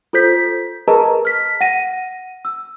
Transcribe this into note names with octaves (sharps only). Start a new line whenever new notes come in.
F4 A4 C5 G6 B6
G#4 A#4 B4 D#5 A5 A#5
F6 B6
F#5 A#6 D#7
E6